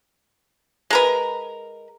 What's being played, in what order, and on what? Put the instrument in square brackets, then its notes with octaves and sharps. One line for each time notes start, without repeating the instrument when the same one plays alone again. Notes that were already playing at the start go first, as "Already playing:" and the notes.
[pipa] G#3 A#4 B4